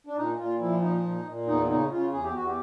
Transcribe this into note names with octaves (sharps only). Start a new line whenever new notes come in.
D4
A#2 D#4
A#2 F4
F3 E4
A#2 D#4
A#2
A#2
E2 D#4
C#3 D#4
C#3 F4
E2 G#4
G4
E2 F#4
G4